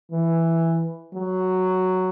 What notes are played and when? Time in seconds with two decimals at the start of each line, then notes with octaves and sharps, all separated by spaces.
0.12 E3
1.14 F#3